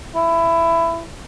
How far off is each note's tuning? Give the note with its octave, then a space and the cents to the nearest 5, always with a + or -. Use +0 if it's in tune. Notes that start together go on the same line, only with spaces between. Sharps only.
E4 +15